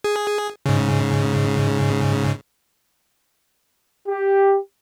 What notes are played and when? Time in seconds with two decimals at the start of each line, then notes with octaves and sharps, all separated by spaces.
0.04 G#4
0.66 G#2 C#3
4.06 G4